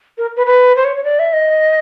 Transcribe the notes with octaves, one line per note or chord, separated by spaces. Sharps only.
A#4
B4
B4
C5
C#5
C#5
D5
E5
D#5